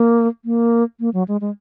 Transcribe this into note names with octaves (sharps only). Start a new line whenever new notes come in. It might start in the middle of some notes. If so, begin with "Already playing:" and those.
Already playing: A#3
A#3
A#3
F#3
G#3
G#3